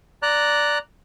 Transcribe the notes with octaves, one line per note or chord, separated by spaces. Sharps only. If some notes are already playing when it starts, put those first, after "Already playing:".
D5 A#5 F#6